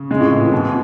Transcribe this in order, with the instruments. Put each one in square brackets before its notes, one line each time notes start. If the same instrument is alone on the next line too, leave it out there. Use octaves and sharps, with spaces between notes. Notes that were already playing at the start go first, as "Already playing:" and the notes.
Already playing: [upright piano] C#3
[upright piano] C#3 [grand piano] G#3
[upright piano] A2
[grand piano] E3
[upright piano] A2
[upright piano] G#2 [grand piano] B2